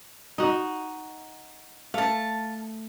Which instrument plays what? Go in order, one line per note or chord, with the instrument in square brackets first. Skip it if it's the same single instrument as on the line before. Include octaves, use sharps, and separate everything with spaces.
[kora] D#4 F#4
[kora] A3 [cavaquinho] F5 A5